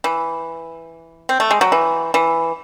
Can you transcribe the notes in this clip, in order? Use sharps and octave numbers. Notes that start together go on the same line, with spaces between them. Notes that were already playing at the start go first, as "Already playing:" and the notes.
E3
C4
A3
G#3
F#3
E3
E3